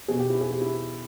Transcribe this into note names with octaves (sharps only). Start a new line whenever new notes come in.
B2 G#4
G4
E4
G#4
G4
E4